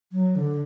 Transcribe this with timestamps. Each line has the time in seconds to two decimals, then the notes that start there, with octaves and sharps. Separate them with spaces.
0.12 F#3
0.36 D3